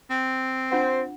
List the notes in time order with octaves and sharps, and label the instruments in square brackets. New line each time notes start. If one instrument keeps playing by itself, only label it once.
[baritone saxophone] C4
[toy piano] D4 F4 F#5 [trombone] C5